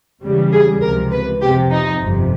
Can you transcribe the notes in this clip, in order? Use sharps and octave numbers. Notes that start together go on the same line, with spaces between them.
E2 C#3 E3 G3
G#4
C#2 C3 F3 A#4
B4
F2 C3 F3 G4
D#4
G1 F2 C3